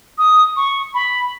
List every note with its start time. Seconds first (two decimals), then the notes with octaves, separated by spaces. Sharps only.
0.18 D#6
0.56 C#6
0.94 B5